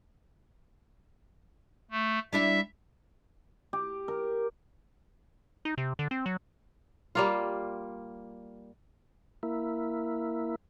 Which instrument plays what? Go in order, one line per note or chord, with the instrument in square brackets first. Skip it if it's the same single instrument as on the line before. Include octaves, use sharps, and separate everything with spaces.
[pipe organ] A3
[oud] G3 D4 E4 [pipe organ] E5
[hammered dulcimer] G4
A#4
[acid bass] D#4
C3
D3
C4
F#3
[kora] G3 A#3 F4
[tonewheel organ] A#3 E4